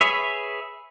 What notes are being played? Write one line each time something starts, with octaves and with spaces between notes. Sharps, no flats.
G#4 B4 C#5 E5